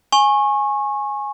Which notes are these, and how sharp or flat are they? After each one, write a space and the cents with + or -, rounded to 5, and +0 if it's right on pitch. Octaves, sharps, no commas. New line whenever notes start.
G#5 +0 C#6 -25